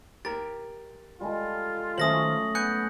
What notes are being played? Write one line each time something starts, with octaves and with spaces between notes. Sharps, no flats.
G4 A#4 A6
G3 G#3 F4 A4
D#3 F#3 A3 C#4 C5 D#6 A#6 F#7
B3 G#5 F#6 G6 C#7